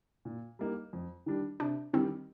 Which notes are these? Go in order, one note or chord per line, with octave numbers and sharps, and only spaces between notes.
A#2
G3 A#3 D#4
F2
D#3 G3 D4
C3 D4
D#3 G3 C4